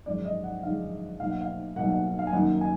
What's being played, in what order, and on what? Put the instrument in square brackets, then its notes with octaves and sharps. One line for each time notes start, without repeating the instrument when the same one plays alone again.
[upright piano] G#1 F#2 D3 F3 G#3 D5
D#5
F#5
G#1 F#2 D3 F3 G#3 F5
B1 B2 A#3 F5
F#5
F5
B1 B2 A#3 F#5
F#5
F5
G#5
F#2 D#3 A#3 F#5
G#5